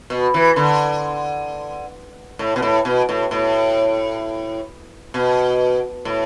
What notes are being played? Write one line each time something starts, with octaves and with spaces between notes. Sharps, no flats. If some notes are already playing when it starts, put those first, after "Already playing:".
B2
E3
D3
A2
B2
A2
B2
A2
A2
B2
A2